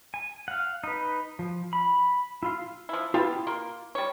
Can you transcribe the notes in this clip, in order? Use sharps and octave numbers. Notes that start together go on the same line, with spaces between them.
G#5
F5 F#5
D#4 B4
F3
B5
E4 F4 F5
F3 E4
B3 E4 F4 G4 A5
A#3 C6
G3 C#5